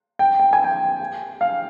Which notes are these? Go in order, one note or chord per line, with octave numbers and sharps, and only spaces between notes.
G5
G5
G#5
G5
F5